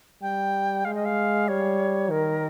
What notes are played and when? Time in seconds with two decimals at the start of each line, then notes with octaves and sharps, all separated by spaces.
0.22 G3 G5
0.85 G#3 F5
0.94 D#5
1.05 F5
1.48 G3 C#5
2.10 D#3 A#4